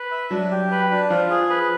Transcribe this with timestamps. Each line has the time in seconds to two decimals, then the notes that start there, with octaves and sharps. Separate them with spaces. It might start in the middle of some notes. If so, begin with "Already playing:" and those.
Already playing: B4
0.11 E5
0.31 F#3 D4
0.51 G4
0.71 B4
0.90 D4
1.10 F3 F4
1.30 G#4
1.50 B4